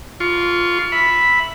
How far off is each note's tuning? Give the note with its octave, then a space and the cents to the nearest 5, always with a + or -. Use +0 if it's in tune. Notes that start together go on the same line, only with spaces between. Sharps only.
F4 +0 C#6 +25
E5 +0 B5 +0